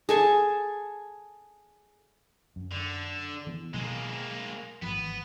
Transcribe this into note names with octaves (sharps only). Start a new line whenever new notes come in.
G#4 A4 G#5
F#2
D3
E3 B3
B2 F#3 G#3 A#3
G#1 E3 F3 B3